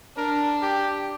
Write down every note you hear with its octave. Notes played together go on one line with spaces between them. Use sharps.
D4 A#4
G4